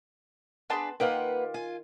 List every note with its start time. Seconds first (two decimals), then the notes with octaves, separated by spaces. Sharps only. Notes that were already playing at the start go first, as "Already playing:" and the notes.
0.70 B3 D4 G#4 B4 A5 C6
1.00 D#3 A#3 F4 G4 A#4 B4 F#5
1.54 F4 G#5